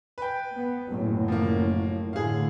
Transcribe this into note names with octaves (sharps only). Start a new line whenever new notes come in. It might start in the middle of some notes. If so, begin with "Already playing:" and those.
B4 G5
B3
F#1 A2 F#3
F3 A#3
A2 D3 G#4 F5